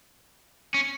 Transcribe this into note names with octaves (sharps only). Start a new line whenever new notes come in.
C#4